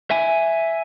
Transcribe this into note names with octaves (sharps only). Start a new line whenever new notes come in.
E5 G#5